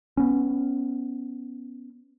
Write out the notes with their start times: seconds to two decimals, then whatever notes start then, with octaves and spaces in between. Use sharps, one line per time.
0.17 B3 C#4